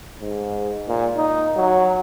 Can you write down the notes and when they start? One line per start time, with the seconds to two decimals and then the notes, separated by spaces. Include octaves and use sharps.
0.21 G#2
0.89 A#2
1.17 D#4
1.56 F#3